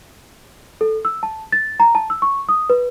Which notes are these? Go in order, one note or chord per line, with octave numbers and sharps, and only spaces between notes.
A4
E6
A5
A6
A#5
A5
E6
C#6
D#6
B4